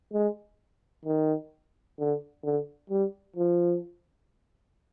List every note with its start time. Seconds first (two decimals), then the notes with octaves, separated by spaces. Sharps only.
0.13 G#3
1.05 D#3
1.99 D3
2.44 D3
2.90 G3
3.37 F3